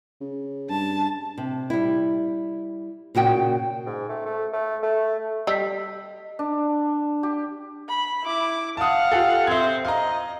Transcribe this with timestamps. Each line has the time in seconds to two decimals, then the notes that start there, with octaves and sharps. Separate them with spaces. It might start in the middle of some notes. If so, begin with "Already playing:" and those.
0.21 C#3
0.70 G2 A5
1.38 C3
1.70 G3 E4
3.15 A#2 C#3 F#4 G5
3.86 G#2
4.09 A3
4.26 A3
4.53 A3
4.83 A3
5.47 G3 D#5 E6 B6
6.39 D4
7.23 G4
7.89 B5
8.23 E4 D6
8.77 F5 F#5 A5 D#6
9.12 F4 G4 A4
9.47 C4 C5 E5 G#6
9.85 D#5 F5 A#5